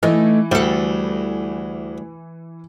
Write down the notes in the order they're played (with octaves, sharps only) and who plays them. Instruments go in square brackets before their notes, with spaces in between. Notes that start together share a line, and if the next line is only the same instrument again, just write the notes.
[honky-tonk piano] E3 [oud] A3 D#4
[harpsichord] D2 [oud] G3 A4